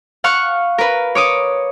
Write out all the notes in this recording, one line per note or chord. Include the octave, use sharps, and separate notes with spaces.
F5 F#5 C#6 F6
A#4 B4
C#5 D6 D#6